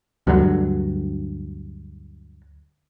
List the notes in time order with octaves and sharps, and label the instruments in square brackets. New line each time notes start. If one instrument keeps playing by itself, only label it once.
[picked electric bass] D2 G2 D3 F#3